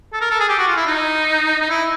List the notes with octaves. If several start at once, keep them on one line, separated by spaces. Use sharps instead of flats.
A4
A#4
A4
G#4
G4
F#4
F4
E4
D#4
D#4
E4